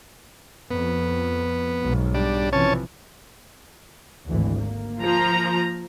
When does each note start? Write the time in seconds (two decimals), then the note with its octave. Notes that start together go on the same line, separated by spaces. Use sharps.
0.71 F2 B3
1.81 B1 G#2
2.14 G3 D4
2.53 C3 E3 F3 C#4 C#5 A5
4.27 G#1 D2 E3
4.61 A#3
5.01 F3 A#5